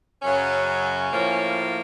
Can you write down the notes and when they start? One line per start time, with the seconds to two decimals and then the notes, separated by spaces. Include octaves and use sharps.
0.22 F#2 C#3 F#3 C#4
0.66 C#4
1.11 A2 F3 A#3